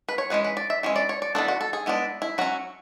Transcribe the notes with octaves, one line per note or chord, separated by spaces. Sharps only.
B4
C#5
E3 G#3 C#4 B4
B4
D5
E5
E3 G#3 C#4
D5
C#5
D5
E3 B3 D4 A4
F#4
A4
G#4
G#3 B3 D4 E4
E4
F#3 C#4 F#4